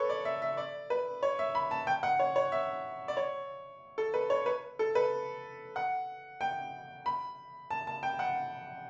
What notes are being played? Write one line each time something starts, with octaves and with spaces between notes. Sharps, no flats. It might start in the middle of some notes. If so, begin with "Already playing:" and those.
Already playing: A4 B4 C#5
D5
E5
E5
D5
B4
C#5
E5
B5
A5
G5
F#5
C#5
C#5
E5
D5
C#5
A4
B4
C#5
B4
A4
B4
F#5
G5
B5
A5
A5
G5
F#5